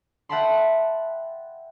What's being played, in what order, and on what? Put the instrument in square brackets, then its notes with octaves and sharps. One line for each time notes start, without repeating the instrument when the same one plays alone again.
[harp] E5 F#5 G5 A5 B5 C6